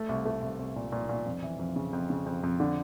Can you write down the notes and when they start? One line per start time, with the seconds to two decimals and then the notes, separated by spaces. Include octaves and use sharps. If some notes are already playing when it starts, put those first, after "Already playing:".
Already playing: A3
0.09 C2
0.25 A3
0.42 C2
0.59 C2
0.76 A#2
0.92 A#2
1.09 A#2
1.26 F2
1.43 E3
1.59 F2
1.76 C#3
1.93 F2
2.10 C#3
2.26 F2
2.43 F2
2.60 D3